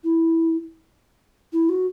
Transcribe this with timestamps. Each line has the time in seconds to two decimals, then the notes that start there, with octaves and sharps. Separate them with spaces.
0.04 E4
1.53 E4
1.69 F#4